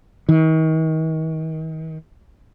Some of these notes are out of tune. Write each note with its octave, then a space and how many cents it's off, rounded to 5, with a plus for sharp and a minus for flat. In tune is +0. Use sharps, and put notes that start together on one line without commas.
D#3 +40